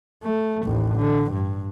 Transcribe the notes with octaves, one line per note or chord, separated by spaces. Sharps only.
A3
A1 D#2
D3
G2